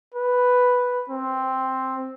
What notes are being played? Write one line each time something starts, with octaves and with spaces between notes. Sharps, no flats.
B4
C4